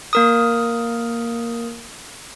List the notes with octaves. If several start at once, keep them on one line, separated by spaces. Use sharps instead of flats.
A#3 A#4 D#6